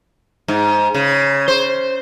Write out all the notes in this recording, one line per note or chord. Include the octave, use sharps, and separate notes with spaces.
G#2
C#3
C5